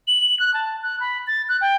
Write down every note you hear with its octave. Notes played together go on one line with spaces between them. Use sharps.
F#7
F#6
A5
F#6
B5
A6
F#6
G5